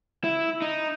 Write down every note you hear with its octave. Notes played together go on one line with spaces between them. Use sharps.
E4
D#4